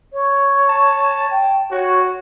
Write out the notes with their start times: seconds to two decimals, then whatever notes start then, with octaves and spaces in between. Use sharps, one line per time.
0.13 C#5
0.69 A5
1.30 G5
1.71 F#4 C#5